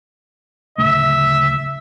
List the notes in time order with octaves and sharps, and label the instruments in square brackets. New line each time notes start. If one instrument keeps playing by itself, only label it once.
[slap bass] D1 C#3 A3 [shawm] E5